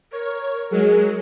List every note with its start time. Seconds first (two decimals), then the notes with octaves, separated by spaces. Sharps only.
0.12 A#4 C#5
0.71 F#3 G#3 G#4